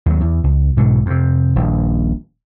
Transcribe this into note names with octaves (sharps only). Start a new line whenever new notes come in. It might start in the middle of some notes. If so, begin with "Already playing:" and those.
D#2 F#3
E2
C#2
B1 G#2 B2 D3
F2 C3
D#1 A#1